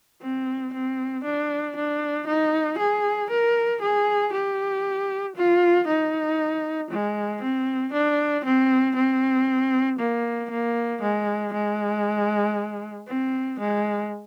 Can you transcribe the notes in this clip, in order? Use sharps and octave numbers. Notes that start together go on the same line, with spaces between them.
C4
C4
D4
D4
D#4
G#4
A#4
G#4
G4
F4
D#4
G#3
C4
D4
C4
C4
A#3
A#3
G#3
G#3
C4
G#3